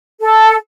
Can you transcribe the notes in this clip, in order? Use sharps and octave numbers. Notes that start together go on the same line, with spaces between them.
A4